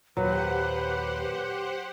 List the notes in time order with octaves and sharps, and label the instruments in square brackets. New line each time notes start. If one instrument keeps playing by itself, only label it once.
[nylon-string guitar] D#2 A#2 [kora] F#3 [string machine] G4 C5 F#5 [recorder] B4